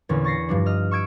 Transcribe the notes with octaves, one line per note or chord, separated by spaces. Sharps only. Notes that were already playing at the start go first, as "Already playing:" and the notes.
E2 A#2 D3 C#4
C#6 A6 A#6 C7
G2 F3 D4
D#5 F6
C#6 E6 G#6 D7